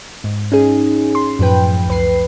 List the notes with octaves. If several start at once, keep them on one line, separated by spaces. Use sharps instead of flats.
G#2
C#4 D#4 G#4
C6
F#2 A2 F3 B4 G5
C#2 B4 C7